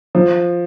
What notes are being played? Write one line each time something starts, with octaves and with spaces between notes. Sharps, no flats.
F3